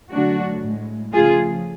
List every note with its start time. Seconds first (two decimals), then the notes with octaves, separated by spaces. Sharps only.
0.11 D3 F#3 A3 D4 F#4
0.62 A2 G#3
1.12 C#3 F3 A3 F4 G#4